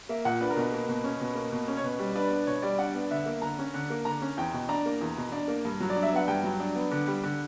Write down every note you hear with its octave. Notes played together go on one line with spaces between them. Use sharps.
A#3 E5
A#2 F#5
D4 B4
A#4
B2 B4
A#3
B2
C#4
B2 B4
A#3
B2
C#4
C#5
B2 B4
G3
D4 B4
B3
B2 C#5
G3 D5
D4 F#5
B3
D3 E5
A#3
D3 A#5
C#4
D3
A#3
D3 A#5
C#4
E2 G5
B2
D4 A#5
A#3
E2
B2
D4
A#3
G2
F#3
D5
D4
E5
B3 F#5
G2 G5
F#3
D4
B3
D3
G3
D3